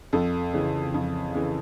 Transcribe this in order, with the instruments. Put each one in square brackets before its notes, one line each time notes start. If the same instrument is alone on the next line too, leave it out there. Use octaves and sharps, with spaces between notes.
[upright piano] F2 A4
C#3 E3
F2
C#3 E3